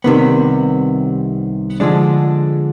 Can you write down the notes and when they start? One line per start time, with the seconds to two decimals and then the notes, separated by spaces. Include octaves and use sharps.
0.04 C2 C3 D#3 B3
1.80 D3 F3 G#3 D4